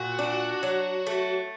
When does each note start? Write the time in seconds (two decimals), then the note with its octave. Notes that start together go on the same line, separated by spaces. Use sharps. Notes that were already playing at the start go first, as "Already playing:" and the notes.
Already playing: A#2 F#4
0.19 D4
0.63 F#3
1.06 A3